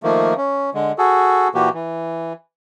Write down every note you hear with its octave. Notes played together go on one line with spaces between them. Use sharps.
D#3 F3 A3 A#3
C#4
D3 G#3
F#4 G#4 A4
A#2 E3 A#3 F#4 G4
E3